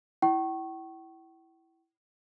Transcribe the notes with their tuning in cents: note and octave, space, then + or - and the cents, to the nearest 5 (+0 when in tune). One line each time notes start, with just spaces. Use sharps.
E4 +0 G5 -40 C#6 -20